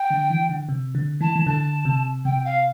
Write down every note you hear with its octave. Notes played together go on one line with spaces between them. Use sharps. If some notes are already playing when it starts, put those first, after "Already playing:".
Already playing: G5
D3
E3
D3
C3
D3
E3 A5
E3
D3 A5
C3
C3 G5
F5